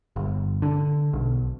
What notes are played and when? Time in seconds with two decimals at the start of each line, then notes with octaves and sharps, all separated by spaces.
0.16 G1
0.62 D3
1.13 B1